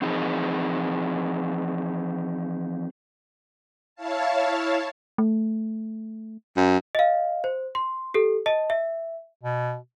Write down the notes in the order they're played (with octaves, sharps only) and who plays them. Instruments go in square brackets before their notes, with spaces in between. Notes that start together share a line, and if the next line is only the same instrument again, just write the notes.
[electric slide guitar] E3 F3 C4 D#4 G#4 D#5
[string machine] E4 C#5 F5 A5
[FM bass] A3
[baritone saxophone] F#2
[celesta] D#5 F5
C5
C6
G4 A4
D#5 A5
E5
[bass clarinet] B2